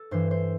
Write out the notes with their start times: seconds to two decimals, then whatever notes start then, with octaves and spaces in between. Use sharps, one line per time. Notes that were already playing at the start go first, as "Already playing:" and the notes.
Already playing: A4
0.11 G2 E3 C5
0.31 C5